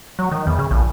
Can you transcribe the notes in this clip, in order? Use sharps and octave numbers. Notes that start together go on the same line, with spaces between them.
F#3
D#3
E2
C#3
A#1